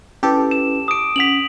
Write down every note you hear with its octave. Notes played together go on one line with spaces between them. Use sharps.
C#4 E4 G4 A4 B4
E7
D6 D#6 D7
C#4 F#5 B6 F7 F#7